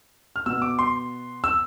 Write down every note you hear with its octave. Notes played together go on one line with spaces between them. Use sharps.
F6
B2 B3 E6
D6
C6
E6